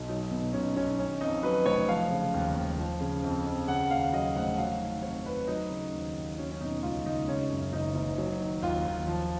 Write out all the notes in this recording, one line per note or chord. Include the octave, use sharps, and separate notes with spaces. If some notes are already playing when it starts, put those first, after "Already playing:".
Already playing: B1
F#3 D#4
B2
B1 C#4
B1 C#4
D#3 C#4
F2 D#4
F#3 B4
F1 C#5
F3 F5
C#3
D#2
D#2
F3
C#3
F2
F2
C#3 F#5
D#2 F5
F#3 D#5
F1 F#5
F#3 F5
D#3
F2 C#5
F2 B4
F#3 D#4
C#3
D#2
D#2
F#3 C#4
C#4
B2 D#4
C#2 F4
C#2 D#4
C#3 C#4
F#2
F#1 D#4
F#1
F#3
D#3
D#2 F4
D#2
F3